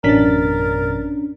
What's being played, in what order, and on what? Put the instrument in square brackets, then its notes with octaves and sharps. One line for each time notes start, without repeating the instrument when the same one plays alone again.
[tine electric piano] A1 B6 [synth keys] F#2 B2 A6 [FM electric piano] C#4 D4 [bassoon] A#4